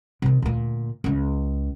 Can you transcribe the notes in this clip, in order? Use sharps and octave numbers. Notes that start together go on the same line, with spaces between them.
C3 D#3
D2 A#2
C#2 C#3